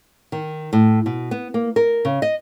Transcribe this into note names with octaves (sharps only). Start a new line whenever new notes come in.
D#3
A2
B2
B3
A#3
A#4
C#3
D#5